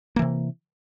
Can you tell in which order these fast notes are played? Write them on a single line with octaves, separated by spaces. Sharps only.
A#3 E3 C3